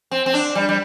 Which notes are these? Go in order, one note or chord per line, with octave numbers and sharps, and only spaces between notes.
C4
C4
D4
G3
G3